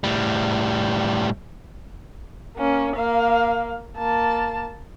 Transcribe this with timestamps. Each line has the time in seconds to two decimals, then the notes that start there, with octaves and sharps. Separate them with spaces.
0.04 A2 G3
2.56 A#3 C#4
2.95 A#3 F5
3.97 A#3 A5